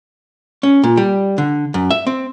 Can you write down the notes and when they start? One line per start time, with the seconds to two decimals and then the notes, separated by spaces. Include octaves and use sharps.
0.63 C#4
0.83 A#2
0.97 G3
1.38 D3
1.74 F#2
1.90 E5
2.07 C4